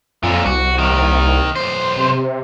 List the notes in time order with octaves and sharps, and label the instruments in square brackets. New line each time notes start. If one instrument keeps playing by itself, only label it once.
[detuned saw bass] F2 [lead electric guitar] A#2 D3
[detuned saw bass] C2 [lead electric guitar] F#4
[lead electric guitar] D#2 D#3
B1 C5
[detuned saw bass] C3